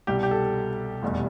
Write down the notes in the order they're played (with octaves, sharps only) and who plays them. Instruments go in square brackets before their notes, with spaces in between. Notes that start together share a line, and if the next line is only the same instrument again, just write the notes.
[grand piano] C2 B2 G3 G4
G4
A4
F1 E2 B2 G3